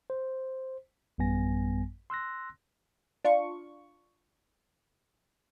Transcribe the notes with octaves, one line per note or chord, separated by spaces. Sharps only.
C5
A1 F#2 G3 B3 G#5 A#6
C6 E6 F#6 A#6
D4 F4 C#6